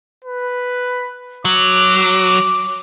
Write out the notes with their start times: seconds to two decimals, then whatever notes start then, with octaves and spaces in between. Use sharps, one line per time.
0.24 B4
1.45 F#3 D6